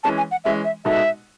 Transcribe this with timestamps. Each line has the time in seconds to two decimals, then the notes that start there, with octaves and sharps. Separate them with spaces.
0.04 E3 G#3 C#4 A5
0.17 G#5
0.31 F#5
0.44 E3 G#3 C#4 E5
0.64 E5
0.85 B2 G#3 D#4 F#4 A4 E5